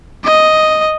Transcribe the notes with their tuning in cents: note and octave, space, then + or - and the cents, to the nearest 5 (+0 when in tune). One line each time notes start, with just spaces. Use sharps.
D#5 +5